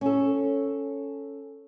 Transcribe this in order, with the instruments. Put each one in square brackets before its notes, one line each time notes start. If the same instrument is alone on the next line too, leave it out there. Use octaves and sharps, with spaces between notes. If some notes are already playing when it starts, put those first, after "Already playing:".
[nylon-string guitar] C#4 A4